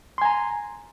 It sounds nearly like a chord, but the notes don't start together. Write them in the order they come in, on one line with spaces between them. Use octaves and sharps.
C6 G#5 A#5